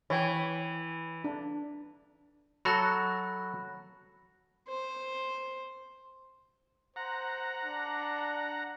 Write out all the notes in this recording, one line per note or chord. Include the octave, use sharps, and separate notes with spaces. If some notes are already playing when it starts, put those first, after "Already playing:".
E3 C#5 G5
D4
F#3 F#4 A4 B5 F#6 A#6
C5
C5 F#5 A#5
D4